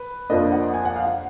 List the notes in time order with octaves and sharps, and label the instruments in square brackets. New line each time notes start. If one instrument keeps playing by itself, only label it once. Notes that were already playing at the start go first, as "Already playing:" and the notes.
Already playing: [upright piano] B4
F2 F3 A#3 D4 D#5
F#5
G#5
F#5
F5
F#5